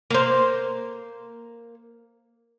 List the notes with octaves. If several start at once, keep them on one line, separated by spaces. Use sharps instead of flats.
A#3 C5